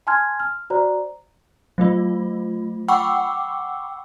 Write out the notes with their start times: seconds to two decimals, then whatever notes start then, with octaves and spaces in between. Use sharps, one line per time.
0.07 G#5 A5 C6 F6 G#6
0.40 F6
0.70 F#4 C5 D5 A#5
1.78 F#3 A3 F4
2.88 F#5 G5 B5 C#6 D6 E6